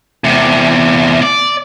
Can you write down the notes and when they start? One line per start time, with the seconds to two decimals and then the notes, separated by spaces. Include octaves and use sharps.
0.24 E2 C3
1.22 D5